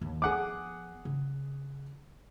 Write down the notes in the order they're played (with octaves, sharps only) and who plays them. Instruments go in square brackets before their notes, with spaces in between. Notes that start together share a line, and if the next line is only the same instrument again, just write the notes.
[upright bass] D#2
[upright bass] F3 B3 [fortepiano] G#4 F#5 D6
[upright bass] C#3